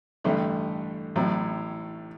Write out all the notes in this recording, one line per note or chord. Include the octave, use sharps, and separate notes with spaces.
A1 G2 D3 A3
A1 A2 F#3